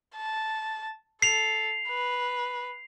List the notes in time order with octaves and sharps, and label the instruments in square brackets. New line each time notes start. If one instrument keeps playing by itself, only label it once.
[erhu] A5
[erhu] A4 [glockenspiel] C7 F7
[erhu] B4